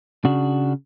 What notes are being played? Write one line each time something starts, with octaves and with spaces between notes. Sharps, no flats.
C#3 D4 F#4